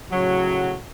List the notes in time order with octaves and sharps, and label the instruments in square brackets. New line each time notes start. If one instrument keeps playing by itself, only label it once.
[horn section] A2 C#3 F#3